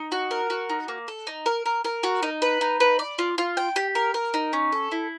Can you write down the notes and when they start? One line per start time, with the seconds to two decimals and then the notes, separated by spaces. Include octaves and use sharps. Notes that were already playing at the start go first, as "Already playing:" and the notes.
Already playing: D#4
0.12 F#4
0.31 A#4
0.50 F#4
0.70 D#4
0.88 A#3
1.08 A4
1.27 D#4
1.46 A#4
1.66 A#4
1.84 A#4
2.03 F#4
2.23 D#4
2.42 B4
2.61 D#4
2.80 B4
2.99 D5
3.18 F4
3.38 F4
3.57 G5
3.76 G4
3.95 A#4
4.14 A#4
4.34 D#4
4.53 C#4
4.72 A4
4.91 E4